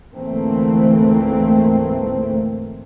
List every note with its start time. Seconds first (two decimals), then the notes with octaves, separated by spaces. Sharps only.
0.13 D2 G#2 E3 A3 A#3 C4